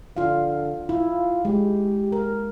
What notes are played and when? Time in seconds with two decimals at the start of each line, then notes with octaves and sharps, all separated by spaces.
0.16 D3 F4 F5
0.89 E4 F4
1.45 G#3 G4
2.12 A#4